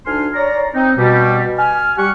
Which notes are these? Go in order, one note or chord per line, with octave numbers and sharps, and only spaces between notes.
D2 D4 D#4 G#5 C6 F6
C#5 D5 A#5
C4 D#4
B2 G3
G#5 F6
G3 G4 F#5 C#6